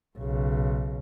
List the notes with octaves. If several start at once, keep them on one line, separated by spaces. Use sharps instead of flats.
B1 C#3